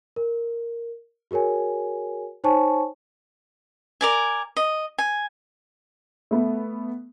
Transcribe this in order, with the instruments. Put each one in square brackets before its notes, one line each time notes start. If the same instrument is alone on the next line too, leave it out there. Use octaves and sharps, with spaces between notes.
[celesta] A#4
F#4 G#4 A#4 C#5 G#5
D#4 C5 C#5 G#5 A5 C#6
[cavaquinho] A#4 D5 G#5
D#5
G#5
[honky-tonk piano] A3 B3